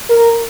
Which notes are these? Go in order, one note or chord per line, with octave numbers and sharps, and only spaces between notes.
A#4